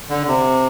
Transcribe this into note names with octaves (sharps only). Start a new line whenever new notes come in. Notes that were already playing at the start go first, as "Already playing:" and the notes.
D3
C3